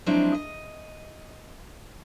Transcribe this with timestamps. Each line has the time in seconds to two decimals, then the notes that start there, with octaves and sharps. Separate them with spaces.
0.06 F3 F#3 G#3 C4 D4 E4
0.34 D#5